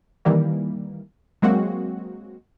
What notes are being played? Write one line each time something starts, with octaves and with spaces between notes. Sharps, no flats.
D#3 E3 G3 A#3
F#3 G#3 A#3 C4 F#4